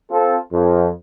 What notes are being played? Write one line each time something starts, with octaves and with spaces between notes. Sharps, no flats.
C4 F4 A4
F2